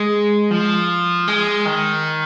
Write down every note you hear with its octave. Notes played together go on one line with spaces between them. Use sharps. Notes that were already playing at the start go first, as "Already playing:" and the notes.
Already playing: G#3
F3
G#3
D#3